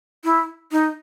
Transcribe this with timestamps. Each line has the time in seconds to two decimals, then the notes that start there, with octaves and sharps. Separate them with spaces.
0.24 E4
0.72 D#4